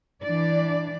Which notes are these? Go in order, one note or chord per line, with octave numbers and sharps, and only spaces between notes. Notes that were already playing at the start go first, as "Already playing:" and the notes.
E3 D4 D5